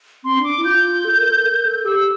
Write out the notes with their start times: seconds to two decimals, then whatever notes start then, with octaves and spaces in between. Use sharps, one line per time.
0.24 C4 C6
0.38 D4
0.44 D6
0.57 E4
0.65 F4 G6
1.05 A4
1.18 A#4
1.31 A4
1.45 A#4
1.66 A4
1.85 G4 E6